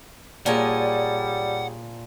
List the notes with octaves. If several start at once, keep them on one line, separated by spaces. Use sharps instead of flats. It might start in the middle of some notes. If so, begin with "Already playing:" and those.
A#2 G3 G#4 C#5 D5 F#5 G#5 A5